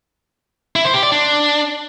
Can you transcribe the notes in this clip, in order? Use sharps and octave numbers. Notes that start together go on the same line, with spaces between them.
E4
C5
G4
D5
D4